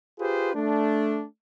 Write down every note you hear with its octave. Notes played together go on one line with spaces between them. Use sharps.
F4 G4 G#4 B4 C5
A3 D4